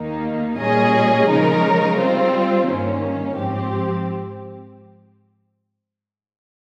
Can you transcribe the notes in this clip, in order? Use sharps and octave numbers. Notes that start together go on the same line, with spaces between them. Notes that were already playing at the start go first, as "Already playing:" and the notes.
Already playing: D#2 D#3 A#3 D#4
A#2 G3 C#4 G#4 D#5
C#3 F3 G#3 D#4 A#4
G3 C4 F4 C5
G2 D#3 A#3 C#4
G#2 F3 C4 G4